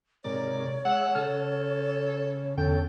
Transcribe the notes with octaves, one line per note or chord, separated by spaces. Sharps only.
G#2 C3 A#4 C#5 D5
G#3 F#5 E6
C#3 A4 F6
E2 D3 C#4 A4 G5